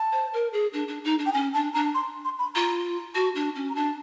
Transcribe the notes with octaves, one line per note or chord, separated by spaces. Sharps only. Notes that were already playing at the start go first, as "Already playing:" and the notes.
Already playing: A5
C5
A#4
G#4
D4
D4
D#4
D4
G5
C#4 G#5
D4 A5
D4 A#5
C6
C6
B5
F4 A#5
F#4 A5
D4
C#4
A#5
D4 A5